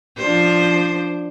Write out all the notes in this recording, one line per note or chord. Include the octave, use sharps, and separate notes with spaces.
F3 D4 C5